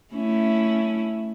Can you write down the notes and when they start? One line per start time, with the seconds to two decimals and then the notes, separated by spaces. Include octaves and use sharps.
0.14 A3 C#4 E4